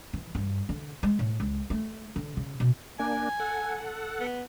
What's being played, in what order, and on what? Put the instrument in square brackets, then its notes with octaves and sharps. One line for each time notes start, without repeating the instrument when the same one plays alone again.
[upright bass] E3
G2
D3
G#3
A2
C#2
A3
D3
C#3
B2
[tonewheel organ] A#3 D4 [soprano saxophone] G#5
[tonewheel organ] A4 F#5
[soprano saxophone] B3